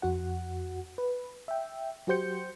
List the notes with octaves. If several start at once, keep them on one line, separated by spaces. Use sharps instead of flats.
F2 F#4 F#5
B4
E5 G5
F#3 F#4 G4 C5 G6 C#7